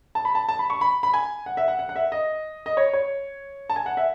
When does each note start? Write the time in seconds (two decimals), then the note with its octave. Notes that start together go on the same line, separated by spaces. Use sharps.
0.15 A5
0.25 B5
0.35 A5
0.49 A5
0.59 B5
0.70 C#6
0.81 B5
1.03 B5
1.14 G#5
1.46 F#5
1.57 E5
1.68 F#5
1.79 F#5
1.89 F#5
1.96 E5
2.12 D#5
2.66 D#5
2.77 C#5
2.93 C#5
3.70 A5
3.76 G#5
3.86 F#5
3.97 E5